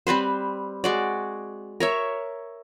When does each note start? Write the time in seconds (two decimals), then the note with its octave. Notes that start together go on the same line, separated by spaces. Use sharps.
0.07 G3 C4 B4 C5
0.84 G#3 F#4 D5
1.80 A#4 C#5 E5